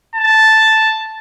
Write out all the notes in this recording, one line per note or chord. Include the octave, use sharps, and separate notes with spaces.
A5